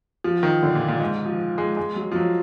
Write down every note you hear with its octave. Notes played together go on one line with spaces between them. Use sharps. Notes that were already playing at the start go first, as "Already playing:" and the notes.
F3
D#3
D3
A#2
A#2
G#2
F3
G#3
G#3
F#3
F3
F#3